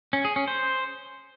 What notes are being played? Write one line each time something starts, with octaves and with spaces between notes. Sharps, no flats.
C#4
G#4
C#4
C5